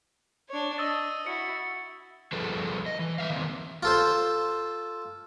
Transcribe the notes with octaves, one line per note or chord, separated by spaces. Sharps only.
D4 C#5
D#5 D#6 E6 A6
E4 F#4 C#7
F3 G3 G#4 A4 B4
D#5
E3
G3 E5 F5
D#3 E3 A#3 C4
F4 A4 C5